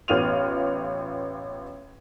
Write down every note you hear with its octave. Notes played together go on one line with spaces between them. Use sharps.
A1 B3 F4 F6 D#7 F7